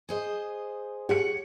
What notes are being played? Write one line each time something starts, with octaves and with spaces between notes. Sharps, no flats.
G#4 C5 D#5
G4 G#4 C#5 F#5 C#7